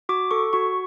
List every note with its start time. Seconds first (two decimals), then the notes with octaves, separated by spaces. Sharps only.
0.09 F#4 D6
0.31 A4 C#6
0.53 F#4 C#6